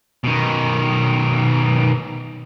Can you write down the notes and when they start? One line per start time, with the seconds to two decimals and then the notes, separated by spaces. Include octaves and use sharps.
0.24 B2 D#3